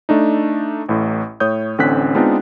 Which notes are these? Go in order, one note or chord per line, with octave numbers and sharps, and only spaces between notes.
A3 D4 D#4
A1 A2
A2 C#5 D#6 G6
A1 D3 C4 C#4 F#6 B6
G#3 B3 C4 D4 D#4 F4